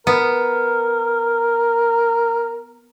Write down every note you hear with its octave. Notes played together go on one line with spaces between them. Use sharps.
B3 A#4